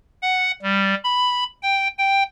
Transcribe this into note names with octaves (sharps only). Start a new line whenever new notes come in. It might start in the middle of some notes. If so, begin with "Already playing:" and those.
F#5
G3
B5
G5
G5